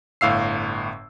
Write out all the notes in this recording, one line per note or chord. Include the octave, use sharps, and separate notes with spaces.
G1 A2 F5 E6 C7